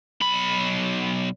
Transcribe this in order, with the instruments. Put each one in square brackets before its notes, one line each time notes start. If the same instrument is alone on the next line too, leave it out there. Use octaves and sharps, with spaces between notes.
[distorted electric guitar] B1 B5